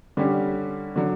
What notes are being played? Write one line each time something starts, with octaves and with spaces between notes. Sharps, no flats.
D3 G3 C#4 G4
D3 F#3